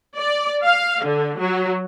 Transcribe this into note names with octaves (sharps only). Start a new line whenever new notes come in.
D5
F5
D3
F#3